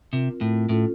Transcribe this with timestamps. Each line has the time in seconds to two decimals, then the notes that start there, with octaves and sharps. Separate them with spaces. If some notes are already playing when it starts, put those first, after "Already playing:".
0.13 C3 C4 F4 A#4
0.41 A2
0.69 A2 C#4 F4 A4